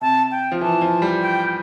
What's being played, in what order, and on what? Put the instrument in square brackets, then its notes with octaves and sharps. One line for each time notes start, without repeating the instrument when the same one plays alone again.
[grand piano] C3 [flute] A5
[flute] G5
[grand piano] F3
[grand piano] E3 [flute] A5
[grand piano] F3
G3
[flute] G5